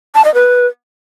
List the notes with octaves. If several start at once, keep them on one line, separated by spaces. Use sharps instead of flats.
A5
D#5
B4